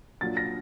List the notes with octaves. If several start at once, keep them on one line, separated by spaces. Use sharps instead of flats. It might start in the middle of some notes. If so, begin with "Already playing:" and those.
A#2 F#3 A#3 D4 F4 A6
A#6